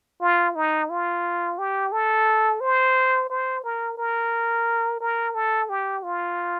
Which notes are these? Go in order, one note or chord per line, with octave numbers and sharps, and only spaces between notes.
F4
D#4
F4
G4
A4
C5
C5
A#4
A#4
A#4
A4
G4
F4